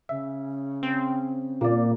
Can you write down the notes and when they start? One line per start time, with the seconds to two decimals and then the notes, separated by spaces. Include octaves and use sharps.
0.09 C#3 E5
0.83 C4
1.61 A#2 A#3 D5